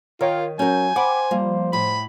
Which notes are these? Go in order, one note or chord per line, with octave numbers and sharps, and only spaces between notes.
D#3 F4 A#4 C#5 G5
F#3 C#4 A#4 G#5 G6
C5 F#5 G5 B5 D6
F3 G3 A#3
A2 B5